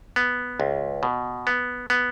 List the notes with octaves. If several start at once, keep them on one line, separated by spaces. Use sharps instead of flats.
B3
C#2
B2
B3
B3